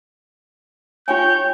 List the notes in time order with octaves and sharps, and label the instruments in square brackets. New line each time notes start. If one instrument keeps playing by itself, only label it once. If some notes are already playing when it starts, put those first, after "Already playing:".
[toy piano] F4 G5 G#5 [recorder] C#5 [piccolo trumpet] G6